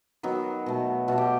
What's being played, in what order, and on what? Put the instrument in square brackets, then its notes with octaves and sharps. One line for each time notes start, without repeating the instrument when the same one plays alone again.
[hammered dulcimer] D#3 F#3 B3
B2 A3
B2 A3 F#4
G4